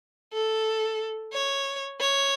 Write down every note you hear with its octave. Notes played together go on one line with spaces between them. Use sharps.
A4
C#5
C#5